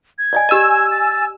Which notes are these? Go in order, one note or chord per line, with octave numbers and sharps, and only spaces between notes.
G#6
D5 D#5 G#5
G4 D#5 G#5 E6
A6